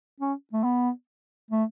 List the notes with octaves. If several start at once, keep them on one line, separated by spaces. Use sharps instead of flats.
C#4
A3
B3
A3